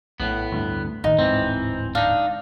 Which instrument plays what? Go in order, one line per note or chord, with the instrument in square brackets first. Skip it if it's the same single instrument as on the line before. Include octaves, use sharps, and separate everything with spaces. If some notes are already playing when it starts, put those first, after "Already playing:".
[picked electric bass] A#1 [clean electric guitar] A2 B3
[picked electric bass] D2 G2
[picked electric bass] A1 D#3 [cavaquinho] D#4
[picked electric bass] D1 G#2 [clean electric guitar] E3 C4
[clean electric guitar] D4 D#4 [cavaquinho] F5